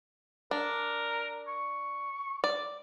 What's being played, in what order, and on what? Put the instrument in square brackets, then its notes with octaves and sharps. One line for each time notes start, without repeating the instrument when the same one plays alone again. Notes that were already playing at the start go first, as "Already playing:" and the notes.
[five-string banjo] D4 [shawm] A#4
[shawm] C#6
[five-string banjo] D5